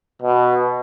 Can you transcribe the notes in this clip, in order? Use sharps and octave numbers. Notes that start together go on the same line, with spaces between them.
B2